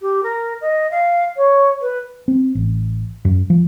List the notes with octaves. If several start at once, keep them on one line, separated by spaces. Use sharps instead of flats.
G4
A#4
D#5
F5
C#5
B4
C4
A1
F#2
F3